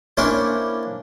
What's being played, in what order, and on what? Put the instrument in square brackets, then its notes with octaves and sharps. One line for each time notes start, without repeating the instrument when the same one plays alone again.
[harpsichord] A#3 C#4 D4 E4 C5